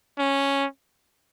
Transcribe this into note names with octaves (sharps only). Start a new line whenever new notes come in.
C#4